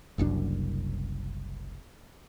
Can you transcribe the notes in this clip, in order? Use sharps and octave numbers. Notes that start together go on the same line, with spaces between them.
F#1 C2 F#2 D4